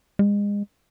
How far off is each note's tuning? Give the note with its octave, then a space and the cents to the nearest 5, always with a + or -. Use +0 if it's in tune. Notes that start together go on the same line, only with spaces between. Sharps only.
G#3 -30